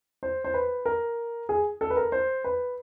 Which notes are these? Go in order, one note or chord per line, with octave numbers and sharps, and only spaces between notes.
C5
C5
B4
A#4
G#4
A4
B4
A#4
C5
B4